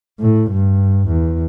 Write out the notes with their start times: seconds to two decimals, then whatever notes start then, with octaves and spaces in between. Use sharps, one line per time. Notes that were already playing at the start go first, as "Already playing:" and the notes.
0.21 A2
0.51 G2
1.09 E2